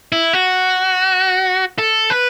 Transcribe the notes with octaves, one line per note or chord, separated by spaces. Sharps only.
E4
F#4
A4
B4